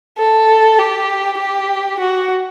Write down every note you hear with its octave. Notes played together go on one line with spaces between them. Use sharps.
A4
G4
G4
F#4